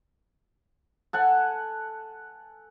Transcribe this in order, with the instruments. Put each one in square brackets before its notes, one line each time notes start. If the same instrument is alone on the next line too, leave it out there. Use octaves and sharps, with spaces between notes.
[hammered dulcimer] A4 F#5 G#5